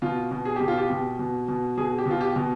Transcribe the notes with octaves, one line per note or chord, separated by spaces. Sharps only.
B2 F4
B2
G#4
B2 G4
F4
G4
B2
B2
B2
B2 G#4
G4
B2
F4
G4
B2